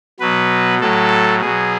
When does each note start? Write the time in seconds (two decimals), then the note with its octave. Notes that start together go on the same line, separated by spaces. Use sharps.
0.20 B2 F#3 B4
0.80 A2 F#3 A4
1.41 B2 F#3 G#4